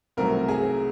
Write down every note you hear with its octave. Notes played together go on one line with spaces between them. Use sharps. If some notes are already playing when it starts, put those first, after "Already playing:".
C2 C3 D#3 F#3 A3 A#4
G#4